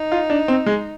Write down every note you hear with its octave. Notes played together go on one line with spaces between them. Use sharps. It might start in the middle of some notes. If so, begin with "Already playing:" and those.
Already playing: D#4
F4
D4
C4
G#3